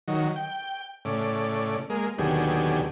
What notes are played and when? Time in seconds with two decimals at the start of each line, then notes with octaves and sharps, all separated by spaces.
0.08 D#3 F#3
0.36 G5
1.05 A2 C#3 D5
1.90 G#3 A#3
2.18 D#2 B2 D3 F#3 G4 G#4